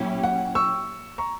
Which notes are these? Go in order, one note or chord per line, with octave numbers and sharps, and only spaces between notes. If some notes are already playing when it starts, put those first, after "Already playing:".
Already playing: A#2 F#3 C#4 E4 G4
F#5
C#6 E6
A#5 C#6